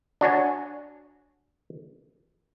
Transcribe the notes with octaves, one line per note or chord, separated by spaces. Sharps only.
D4 F#4 C#5 G#5